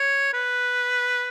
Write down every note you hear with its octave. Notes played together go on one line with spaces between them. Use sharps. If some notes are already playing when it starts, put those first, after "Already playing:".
Already playing: C#5
B4